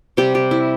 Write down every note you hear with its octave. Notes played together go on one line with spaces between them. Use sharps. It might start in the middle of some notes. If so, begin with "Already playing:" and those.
C3 G3 G4
G4
E4